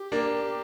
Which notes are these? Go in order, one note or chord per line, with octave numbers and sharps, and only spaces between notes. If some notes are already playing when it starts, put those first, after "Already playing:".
Already playing: G4
A#3 D4